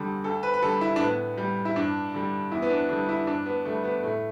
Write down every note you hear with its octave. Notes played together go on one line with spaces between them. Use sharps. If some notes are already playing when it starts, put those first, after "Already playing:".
Already playing: E2 D3 G3
D2 A4
B4
B4
D3 G3 A4
E4
D4
A2 B3
G3
E4
G2 D4
D3 G3
E2 E4
B3
D4
D3 G3 D4
E4
G2 D4
B3
D3 G3 A3
B3
A2 A3